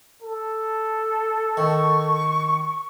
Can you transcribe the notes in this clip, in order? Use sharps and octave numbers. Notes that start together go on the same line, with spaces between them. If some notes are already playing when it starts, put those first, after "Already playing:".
A4
D#3 C#6